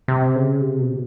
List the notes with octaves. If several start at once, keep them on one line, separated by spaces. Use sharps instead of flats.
C3
C#3
C3
B2